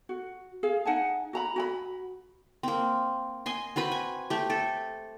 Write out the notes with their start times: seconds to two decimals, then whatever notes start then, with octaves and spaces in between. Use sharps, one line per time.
0.09 F#4
0.63 G#4 F5
0.85 D#4 F#5 G#5 A5
1.33 F#4 A#5 B5
1.56 F#4 G#5 B5
2.63 A#3 C4
3.46 D#5 G#5 C6
3.76 C4 F#4 B4 B5
3.92 G#5
4.30 A3 G4
4.50 A4